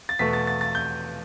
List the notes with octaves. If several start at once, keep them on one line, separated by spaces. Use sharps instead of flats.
A6
E2 B2 A3 B6
A6
A6
A6
G6